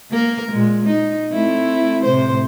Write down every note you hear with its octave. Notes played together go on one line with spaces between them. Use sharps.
A#3 A#4
A#2 G#3
D#4
A3 C4 E4
A2 C3 C5